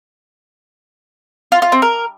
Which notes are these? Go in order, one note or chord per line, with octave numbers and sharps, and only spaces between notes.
F4
F4
C4
A#4